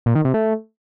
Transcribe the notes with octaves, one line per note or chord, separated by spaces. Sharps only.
A#2
D#3
C3
A3